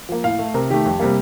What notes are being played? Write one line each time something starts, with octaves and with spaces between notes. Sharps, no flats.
F3 A#3
A2 F5
A3
C3 A#4
D#3 A3 G4
F2
C3 G3 A#3